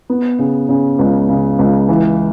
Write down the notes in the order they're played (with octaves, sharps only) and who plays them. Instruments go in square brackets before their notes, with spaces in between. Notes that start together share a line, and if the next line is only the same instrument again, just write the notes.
[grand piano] B3
C#3
C#3
C#2
C#3
C#2
E3